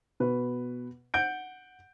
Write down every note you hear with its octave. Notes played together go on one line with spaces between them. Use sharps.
B2 B4
F#5 G6 D7